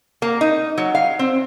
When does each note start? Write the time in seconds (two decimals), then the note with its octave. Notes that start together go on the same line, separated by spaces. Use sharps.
0.22 A#3
0.41 D#4
0.78 F#3
0.95 F5
1.19 C4